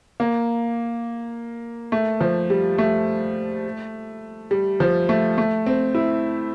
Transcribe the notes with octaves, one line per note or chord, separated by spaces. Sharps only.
A#3
A3
F3
G3
A3
G3
F3
A3
A3
C4
E4